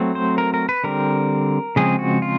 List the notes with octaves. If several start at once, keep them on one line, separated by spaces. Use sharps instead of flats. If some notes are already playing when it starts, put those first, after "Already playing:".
Already playing: F#3 A3 C4
C5
A#4
A#4
B4
D3 G3 C4 A#4
C#3 F3 G#3 C4 G#4
F#4
F4